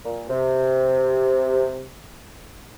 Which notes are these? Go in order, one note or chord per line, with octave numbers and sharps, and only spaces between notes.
A#2
C3